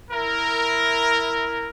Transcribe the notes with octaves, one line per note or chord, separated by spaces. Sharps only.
E4 A#4